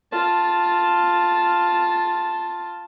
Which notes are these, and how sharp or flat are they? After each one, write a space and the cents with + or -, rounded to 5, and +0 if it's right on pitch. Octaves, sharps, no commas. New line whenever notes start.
F4 +0 A5 +0